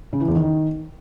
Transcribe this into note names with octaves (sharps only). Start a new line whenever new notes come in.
C#3
E3
E2
D#3